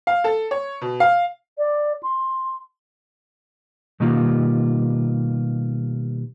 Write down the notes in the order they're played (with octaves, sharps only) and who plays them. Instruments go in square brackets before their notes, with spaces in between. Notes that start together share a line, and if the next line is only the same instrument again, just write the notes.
[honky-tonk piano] F5
A4
C#5
B2
F5
[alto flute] D5
C6
[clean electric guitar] B2 D#3 G3 A#3 F4